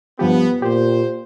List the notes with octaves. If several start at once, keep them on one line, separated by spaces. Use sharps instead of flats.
G2 F3 B3 G4
A#2 G4 C5